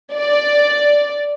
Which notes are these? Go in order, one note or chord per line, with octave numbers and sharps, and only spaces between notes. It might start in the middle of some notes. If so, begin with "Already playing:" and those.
D5